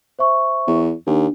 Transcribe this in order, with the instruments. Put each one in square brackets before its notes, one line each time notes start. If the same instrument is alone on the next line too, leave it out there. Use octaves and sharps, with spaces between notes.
[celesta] C5 E5 C#6
[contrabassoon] E2
[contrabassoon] D#2 [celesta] D4